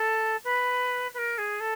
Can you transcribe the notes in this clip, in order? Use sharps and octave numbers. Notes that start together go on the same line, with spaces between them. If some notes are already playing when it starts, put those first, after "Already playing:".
Already playing: A4
B4
B4
A#4
G#4
A4